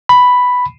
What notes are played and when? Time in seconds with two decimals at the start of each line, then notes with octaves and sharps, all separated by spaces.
0.09 B5